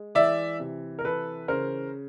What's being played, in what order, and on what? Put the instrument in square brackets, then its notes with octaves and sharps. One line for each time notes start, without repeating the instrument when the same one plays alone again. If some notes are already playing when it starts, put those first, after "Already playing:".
Already playing: [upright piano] G#3
E3 D5 E5
C3
A#4
E3 A4 B4
C#3 A#4 C5